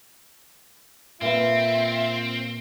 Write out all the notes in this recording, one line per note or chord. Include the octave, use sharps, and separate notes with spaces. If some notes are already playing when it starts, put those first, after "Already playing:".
A#2 C4 F4 B4 E5